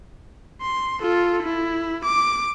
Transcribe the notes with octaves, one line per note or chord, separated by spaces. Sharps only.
C6
F4 A4
E4
D6